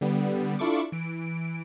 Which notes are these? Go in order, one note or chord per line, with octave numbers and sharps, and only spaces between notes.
D3 G3 B3
D4 E4 F4 A4 C#6 D6
E3 D7